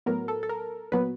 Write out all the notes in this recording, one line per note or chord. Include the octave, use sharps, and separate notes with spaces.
A2 F#3 B3 A#4
A4
A4
A#4
A#2 F#3 B3 B4